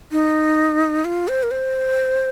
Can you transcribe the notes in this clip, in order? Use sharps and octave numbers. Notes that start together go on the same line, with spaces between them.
D#4
F4
C5
A#4
C5